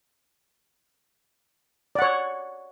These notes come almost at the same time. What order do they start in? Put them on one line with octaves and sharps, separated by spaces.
D5 F#5 C#5